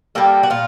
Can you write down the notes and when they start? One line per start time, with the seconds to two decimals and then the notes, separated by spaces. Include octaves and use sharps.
0.15 G3 A#3 G4 A4
0.43 F#4
0.50 A#2 F4